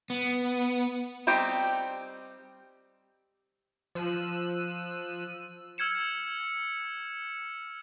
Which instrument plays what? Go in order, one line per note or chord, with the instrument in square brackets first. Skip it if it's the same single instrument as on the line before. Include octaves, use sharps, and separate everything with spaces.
[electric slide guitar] B3
[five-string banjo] G3 C4 D#4 G4
[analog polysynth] F3 E6 F#6 D#7
[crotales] E6 F6 G#6 C#7 E7